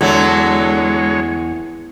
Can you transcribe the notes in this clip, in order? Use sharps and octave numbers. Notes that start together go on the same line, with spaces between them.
E2 D3 F#3 G#3 A3 C#5